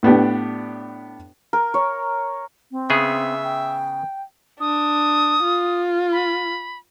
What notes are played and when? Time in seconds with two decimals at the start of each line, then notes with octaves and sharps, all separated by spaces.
0.03 A2 B3 D4 G4
1.53 A#4
1.74 C#5
2.71 C4
2.90 C#3 B3 G#4 E5
3.43 G5
4.60 D4 D#6
5.43 F4
6.12 B5